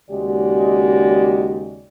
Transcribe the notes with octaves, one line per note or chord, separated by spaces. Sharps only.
D#2 C#3 G#3 F#4 G4 D5